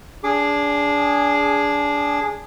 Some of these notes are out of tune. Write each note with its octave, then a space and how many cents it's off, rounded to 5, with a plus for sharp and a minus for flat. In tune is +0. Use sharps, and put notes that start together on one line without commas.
D4 -25 G#4 -5 D6 +20